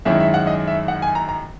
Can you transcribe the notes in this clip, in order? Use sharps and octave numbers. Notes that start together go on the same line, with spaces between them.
F#2 D#3 G#3 C#4 E4 E5
E5
F#5
D#5
E5
F#5
G#5
A#5
A#5